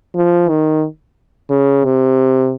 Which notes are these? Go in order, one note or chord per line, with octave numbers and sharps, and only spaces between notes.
F3
D#3
C#3
C3